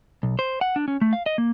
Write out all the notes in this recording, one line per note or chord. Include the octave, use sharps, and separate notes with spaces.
B1
C5
F#5
D4
C#4
A3
F5
D#5
A#3